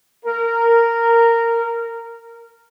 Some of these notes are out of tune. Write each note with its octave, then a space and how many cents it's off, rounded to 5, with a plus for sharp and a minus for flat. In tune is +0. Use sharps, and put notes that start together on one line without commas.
A#4 -10